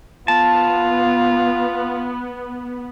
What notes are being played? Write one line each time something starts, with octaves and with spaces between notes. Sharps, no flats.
B3 F4 A5